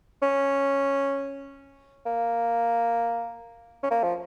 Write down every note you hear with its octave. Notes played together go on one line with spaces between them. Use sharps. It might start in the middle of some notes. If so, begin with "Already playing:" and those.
C#4
A#3
C#4
A#3
F3